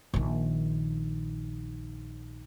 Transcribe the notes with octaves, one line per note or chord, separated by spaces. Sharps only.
A#1 D#3